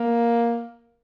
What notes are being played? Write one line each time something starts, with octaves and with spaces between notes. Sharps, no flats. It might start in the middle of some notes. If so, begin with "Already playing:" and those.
Already playing: A#3